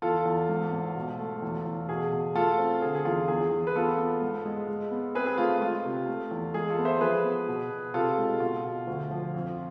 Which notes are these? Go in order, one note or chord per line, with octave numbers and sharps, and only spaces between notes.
E2 F4 A4
E2
G#2
G#2
B2
A3
E2
E2
B2 G#4
B2
A3 F4 A4
C4
D3 G#4
G#4
E2 F4
E2 G#4
E2
B4
B3 F4 A4
B3
G#2
G#3
G#3
B3
C4 G#4 B4
G#4
A3 F4
F4
G#3 F4
C3
A3
E2
G#3 G#4
F4 A4
B3
C5 E5
F3 G#4 B4
B3
B2
B2
C3 F4 A4
G#3
B2 F4
B2
D2
F3
F2